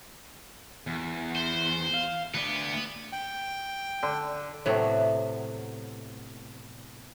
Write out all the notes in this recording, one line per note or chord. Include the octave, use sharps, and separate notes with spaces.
E2
C5
F5
D2 B3 D5
G5
D3
A2 C3 F#3 B3